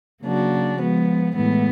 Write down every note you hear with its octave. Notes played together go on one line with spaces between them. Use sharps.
C#3 F#3 A#3 D4 F#4
F3 G#3 B3
A2 E3 G#3 B3